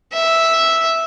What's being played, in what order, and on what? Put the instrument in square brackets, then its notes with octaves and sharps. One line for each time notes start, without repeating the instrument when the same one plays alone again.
[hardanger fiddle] E5